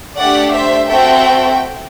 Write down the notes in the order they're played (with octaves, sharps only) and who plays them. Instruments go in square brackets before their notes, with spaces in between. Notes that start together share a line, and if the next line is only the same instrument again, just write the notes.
[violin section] A3 D4 G4 D5 F#5
C5 E5
C4 F#4 A4 E5 G5